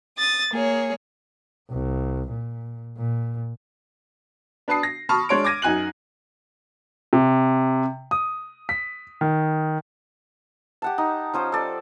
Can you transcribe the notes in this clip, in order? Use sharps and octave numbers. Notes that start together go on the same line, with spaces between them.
D#6 A6
A#3 G#4 C#5
C2
A#2
A#2
D4 B4 A5 D#6 C7
A#6
A5 B5 C#6 D#6 F6
G#3 D4 C#5 C6 D7
D6 G#6 A#6 D#7
F#2 D#4 G#5 F#6 F#7
C3
D#6
B6
D#3
G4 F#5 A5
D#4
F3 C#4 C5
A4 D5